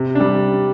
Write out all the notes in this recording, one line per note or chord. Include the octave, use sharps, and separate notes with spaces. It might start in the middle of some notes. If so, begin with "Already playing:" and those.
Already playing: C3
G3 D4